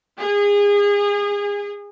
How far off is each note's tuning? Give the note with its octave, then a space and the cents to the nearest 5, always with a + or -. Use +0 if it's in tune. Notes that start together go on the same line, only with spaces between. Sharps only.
G#4 -30